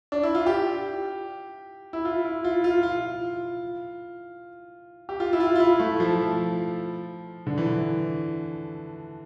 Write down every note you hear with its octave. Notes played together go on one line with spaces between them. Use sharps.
D4
E4
F4
G4
E4
F4
E4
F4
F4
F4
G4
F4
E4
F4
F4
E4
A3
F3
D3
E3